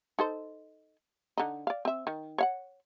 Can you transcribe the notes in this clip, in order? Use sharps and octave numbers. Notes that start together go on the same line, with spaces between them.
D#4 A4 C5
D3 D#4
D5 F5
C4 E5
D#3
C#5 F5 F#5